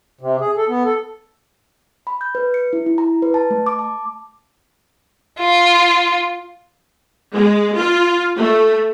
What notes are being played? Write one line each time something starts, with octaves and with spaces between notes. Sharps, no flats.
C3
G#4
A4
B3
A4
B5
G6
B4
C#7
E4
E4
A#5
B4
A5
A3
D6
A5
F4
G#3
F4
A3